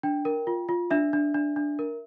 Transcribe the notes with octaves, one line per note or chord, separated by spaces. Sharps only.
D4 G5
A#4
F4
F4
D4 E5
D4
D4
D4
A#4